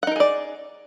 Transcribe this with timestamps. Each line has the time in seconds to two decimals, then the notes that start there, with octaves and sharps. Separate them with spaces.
0.03 F#5
0.07 D#4
0.11 A#4
0.16 G#4
0.20 D5